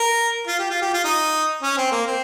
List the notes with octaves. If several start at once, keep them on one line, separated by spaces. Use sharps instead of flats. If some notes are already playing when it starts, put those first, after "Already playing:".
Already playing: A#4
F4
G4
F4
G4
F4
D#4
C#4
C4
A#3
C4